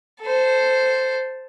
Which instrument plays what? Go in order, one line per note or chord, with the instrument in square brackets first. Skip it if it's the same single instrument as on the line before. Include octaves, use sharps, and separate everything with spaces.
[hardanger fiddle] A4 C5